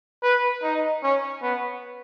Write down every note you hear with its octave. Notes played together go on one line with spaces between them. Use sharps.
B4
D#4
C#4
B3